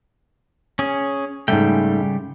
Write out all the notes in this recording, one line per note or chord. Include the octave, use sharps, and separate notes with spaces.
C#4 G#4
G#2 C#3 G3 A3 G5